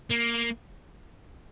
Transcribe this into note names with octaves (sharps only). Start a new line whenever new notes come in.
A#3